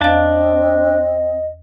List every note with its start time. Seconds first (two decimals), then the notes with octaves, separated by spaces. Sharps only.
0.01 E2 C4 D4 D#5 F5 A5